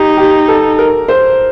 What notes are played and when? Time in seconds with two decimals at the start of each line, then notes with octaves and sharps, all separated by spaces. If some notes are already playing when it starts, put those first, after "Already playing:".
Already playing: D#4 G4
0.17 G4
0.48 A4
0.79 A#4
1.08 C5